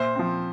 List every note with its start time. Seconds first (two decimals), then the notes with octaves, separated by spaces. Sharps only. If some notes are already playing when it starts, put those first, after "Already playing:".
Already playing: A#2 C5 E5
0.16 F3 C4